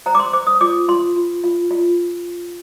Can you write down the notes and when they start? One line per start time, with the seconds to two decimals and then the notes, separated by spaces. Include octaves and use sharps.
0.06 C5 A#5
0.15 D6
0.20 C6
0.33 C5 D6
0.47 D#6
0.61 F4 D6
0.88 F4 C6
1.16 F4
1.44 F4
1.71 F4